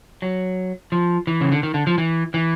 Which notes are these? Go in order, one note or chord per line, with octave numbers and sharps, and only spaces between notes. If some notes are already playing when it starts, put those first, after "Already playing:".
F#3
F3
E3
C#3
D3
D#3
D3
F3
E3
E3